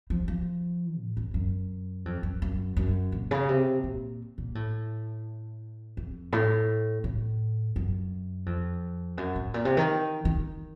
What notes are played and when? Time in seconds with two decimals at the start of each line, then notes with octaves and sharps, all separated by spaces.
0.10 F3
0.28 F3
0.99 A2
1.17 F#2
1.34 F#2
2.05 F2
2.23 F#2
2.42 F#2
2.77 F#2
3.12 A#2
3.31 C#3
3.49 C3
3.84 A#2
4.38 A#2
4.55 A2
5.97 F2
6.32 A2
7.04 A2
7.76 F#2
8.46 F2
9.17 F#2
9.36 A2
9.54 A#2
9.65 C3
9.77 D#3
10.25 D#3